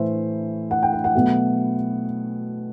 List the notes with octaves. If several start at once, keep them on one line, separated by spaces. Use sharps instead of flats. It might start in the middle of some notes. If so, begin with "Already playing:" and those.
Already playing: A2 E3 A3 C5 E5
F#5
G5
F#5
F#5
B2 F#3 A3